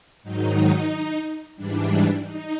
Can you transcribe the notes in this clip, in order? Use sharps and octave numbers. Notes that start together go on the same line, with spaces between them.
G#2 D#3 F#3 D#4
G#2 E3 G3 D4
D#4